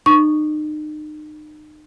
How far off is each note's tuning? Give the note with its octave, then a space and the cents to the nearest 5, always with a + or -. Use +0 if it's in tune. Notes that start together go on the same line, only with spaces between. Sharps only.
D#4 -35 C#6 +0